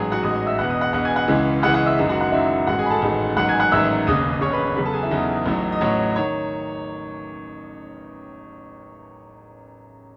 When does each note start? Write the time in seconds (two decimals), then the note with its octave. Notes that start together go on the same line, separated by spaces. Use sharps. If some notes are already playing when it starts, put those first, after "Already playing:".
Already playing: A1 G#2 F#3 G#4 G#5
0.12 F#4 F#5
0.23 A1 G#2 F#3 D#5 D#6
0.35 D#5 D#6
0.47 E5 E6
0.58 E1 E2 B2 F#5 F#6
0.70 D#5 D#6
0.81 F#5 F#6
0.93 E1 E2 B2 F#5 F#6
1.05 G#5 G#6
1.16 F#5 F#6
1.28 C#2 C#3 E3 G#3
1.63 C#2 C#3 E3 G#3 F#5 F#6
1.74 F#5 F#6
1.86 E5 E6
1.98 F#1 F#2 D#3 G#3
2.09 F#4 F#5
2.20 F#4 F#5
2.32 F#1 F#2 D#3 G#3 E4 E5
2.67 A1 G#2 D#3 G#3 F#4 F#5
2.79 G#4 G#5
2.86 B5
2.90 A4 A5
3.02 A1 G#2 D#3 G#3
3.37 A1 G#2 D#3 F#3 F#5 F#6
3.49 G#5 G#6
3.60 F#5 F#6
3.72 A1 G#2 D#3 F#3 E5 E6
4.07 E1 D#2 C#3 D#5 D#6
4.33 D#6
4.41 E1 D#2 C#3 C#5 C#6
4.53 B4 B5
4.76 E2 C#3 F#3 B4 B5
4.85 A4 A5
4.93 G#4 G#5
5.03 E4 E5
5.11 E2 C#3 F#3 D#4 D#5
5.46 A1 A2 F#3
5.72 D#5
5.81 A1 A2 F#3 C#5
6.16 D#3 C#5